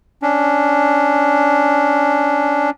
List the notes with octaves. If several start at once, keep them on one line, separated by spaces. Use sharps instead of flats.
C#4 D4